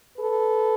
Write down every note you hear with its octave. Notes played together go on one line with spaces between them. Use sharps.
A4 B4